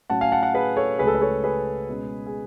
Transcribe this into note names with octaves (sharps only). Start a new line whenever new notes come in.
A2 F#3 C#4 F#5 A5
F5 G#5
F#5 A5
F#5 A5
G#4 B4
A4 C#5
C#2 C#3 F#3 A3 G#4 B4
A4
B4
A4 C#5
G#4 B4
B2 G#3 C#4
G#4